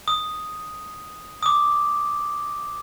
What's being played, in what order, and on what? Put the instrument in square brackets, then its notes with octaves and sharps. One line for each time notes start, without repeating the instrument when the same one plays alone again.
[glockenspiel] D#6
D6 D#6